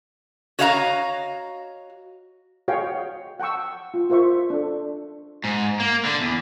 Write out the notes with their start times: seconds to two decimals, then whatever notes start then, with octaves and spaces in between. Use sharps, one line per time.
0.59 F#4 C#5 D#5 F5 F#5 A#5
2.68 F#4 G#4 C#5 D#5 F5 G5
3.40 F#5 G5 A5 C#6 E6
3.94 F4
4.10 F4 A#4 C5 E5 C#6
4.50 D4 A4
5.44 G#2
5.80 A#3
6.05 D3
6.21 E2